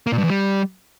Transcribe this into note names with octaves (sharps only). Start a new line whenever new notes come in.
A#3
A#2
G2
E2
G3